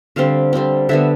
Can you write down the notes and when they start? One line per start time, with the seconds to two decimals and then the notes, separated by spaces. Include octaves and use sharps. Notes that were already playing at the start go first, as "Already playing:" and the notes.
0.16 D3 G3 C4 F5
0.53 D3 G3 C4
0.89 D3 G3 B3 E5